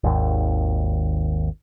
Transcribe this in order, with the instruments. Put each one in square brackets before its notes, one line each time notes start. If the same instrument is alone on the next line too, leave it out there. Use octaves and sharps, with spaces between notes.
[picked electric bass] G#1 D#2